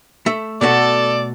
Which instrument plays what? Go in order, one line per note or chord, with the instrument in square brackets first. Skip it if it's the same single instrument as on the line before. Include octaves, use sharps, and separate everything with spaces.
[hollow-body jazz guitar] A3 E5
[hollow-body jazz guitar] B2 A3 F#4 [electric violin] A4 A5 [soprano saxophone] D5